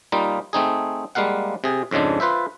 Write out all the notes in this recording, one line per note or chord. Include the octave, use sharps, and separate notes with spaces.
G3 A#3 D#4 F4
A3 C4 D#4 G#4
G3 G#3 A#3 F5 F#5
C3 G#4
F2 G#2 C#3 G#3 D4
F4 B4 C5 E5